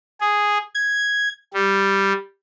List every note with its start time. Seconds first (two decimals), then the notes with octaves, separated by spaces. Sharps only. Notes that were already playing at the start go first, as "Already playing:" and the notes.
0.21 G#4
0.75 G#6
1.54 G3